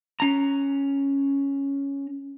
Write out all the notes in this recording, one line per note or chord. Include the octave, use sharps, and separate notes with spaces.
C#4 A#5